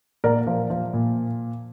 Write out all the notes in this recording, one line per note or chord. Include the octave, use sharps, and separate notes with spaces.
A#2 A#4 D5
F3
F3
A#2